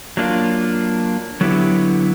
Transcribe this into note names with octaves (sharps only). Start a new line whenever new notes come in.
F#3 A#3 D4 F4
D3 F#3 B3 E4 G4